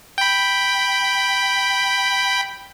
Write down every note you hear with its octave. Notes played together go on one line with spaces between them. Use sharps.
G5 B5